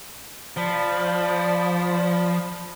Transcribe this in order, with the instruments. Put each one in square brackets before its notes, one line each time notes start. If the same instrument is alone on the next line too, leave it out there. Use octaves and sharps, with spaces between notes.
[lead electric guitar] F3 [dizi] D5 [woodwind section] A5 B5